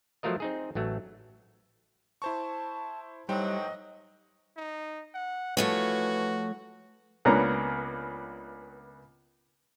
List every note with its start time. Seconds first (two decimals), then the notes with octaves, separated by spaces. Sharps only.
0.23 F3 F#3 A3 F4 A#4 D#5
0.40 C4 D#4 G#4
0.75 A1 F#3 A3
2.22 E4 C5 A5 C#6
3.29 A2 E3 F#3 G3 D#4 C5 D#5 G5
4.57 D#4
5.14 F#5
5.57 E3 F3 A3 F#4 C#5
7.25 C#2 A#3 B3 C#4 D4 A#5